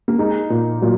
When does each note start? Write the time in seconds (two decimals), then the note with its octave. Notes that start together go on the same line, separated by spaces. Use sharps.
0.08 A#3
0.18 G#3 D#4
0.50 A#2
0.82 A#2 F#3